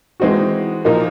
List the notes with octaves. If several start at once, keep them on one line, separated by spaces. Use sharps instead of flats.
E3 G#3 C4 D#4 F#4
A#2 F3 A#3 D#4